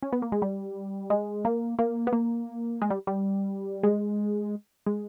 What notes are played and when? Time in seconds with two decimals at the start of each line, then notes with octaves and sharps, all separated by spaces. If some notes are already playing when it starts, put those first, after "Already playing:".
0.03 C#4
0.12 B3
0.22 A#3
0.32 G#3
0.42 G3
1.10 G#3
1.45 A#3
1.79 A#3
2.07 B3
2.13 A#3
2.82 G#3
2.90 G3
3.07 G3
3.83 G#3
4.86 G#3